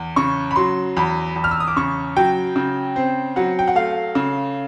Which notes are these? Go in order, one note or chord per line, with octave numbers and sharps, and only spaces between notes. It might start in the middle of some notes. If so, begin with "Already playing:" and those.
Already playing: E2
C#3 C#6
B5
F#3 C6
E2 B5
E2
F6
E6
D#6
D6
C#3 C#6
F#3 G5
C#3
C4
F#3 F#5
G5
F#5
A3 F5
C#3